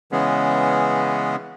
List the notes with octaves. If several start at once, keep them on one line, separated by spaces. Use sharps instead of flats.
C#3 E3 G#3 B3 C#4 G#4